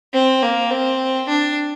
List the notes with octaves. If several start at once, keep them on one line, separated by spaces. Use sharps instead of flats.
C4
A#3
C4
D4